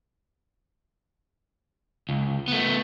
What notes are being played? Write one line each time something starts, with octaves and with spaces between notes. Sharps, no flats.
C#2
A3 B3